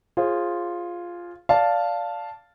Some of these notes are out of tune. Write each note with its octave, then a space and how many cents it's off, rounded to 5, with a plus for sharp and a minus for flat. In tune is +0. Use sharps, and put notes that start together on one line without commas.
F4 +0 G#4 +0 C5 +35
D5 -15 F5 +0 A5 +0